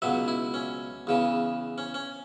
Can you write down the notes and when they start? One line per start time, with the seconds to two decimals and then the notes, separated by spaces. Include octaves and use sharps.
0.02 C#2 B2 F#3 E5
0.28 E4
0.54 C#4
1.07 E2 C#3 E3
1.78 C#4
1.94 C#4